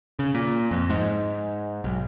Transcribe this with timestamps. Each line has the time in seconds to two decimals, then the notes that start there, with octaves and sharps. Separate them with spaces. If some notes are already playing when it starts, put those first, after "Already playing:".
0.19 C#3
0.34 A#2
0.71 F2
0.90 G#2
1.84 B1